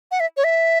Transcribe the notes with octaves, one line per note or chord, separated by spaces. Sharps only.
F#5
E5
C#5
E5